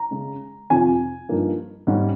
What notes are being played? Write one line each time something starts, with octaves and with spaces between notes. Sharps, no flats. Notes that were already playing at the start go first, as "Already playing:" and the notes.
Already playing: A#5
C#3 G#3 C#4
F2 C3 F3 G#5
G2 F3 A#3 D#4
G#2 G3 C#4